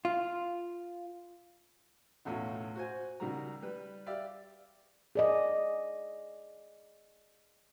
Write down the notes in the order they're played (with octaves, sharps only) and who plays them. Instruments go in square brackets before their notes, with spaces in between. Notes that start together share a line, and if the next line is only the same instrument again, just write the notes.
[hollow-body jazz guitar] F4
[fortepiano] B1 E2 A2 C#4 F4
F#4 C5 G#5
C#2 D#3 F#3 G3 F#4 A#5
G3 B4
G4 D5 E5 F5
[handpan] G#4 D5 D#5